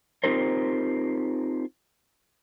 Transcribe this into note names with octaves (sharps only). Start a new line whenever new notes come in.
C4 D#4 F4 G4 A#4 C5